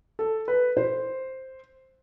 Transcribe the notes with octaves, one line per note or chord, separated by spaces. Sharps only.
A4
B4
C5